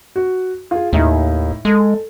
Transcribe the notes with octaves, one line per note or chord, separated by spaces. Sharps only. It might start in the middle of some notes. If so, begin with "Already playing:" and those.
F#4
F4 G#4
D#2 A2 D#4 E4
G#3 A4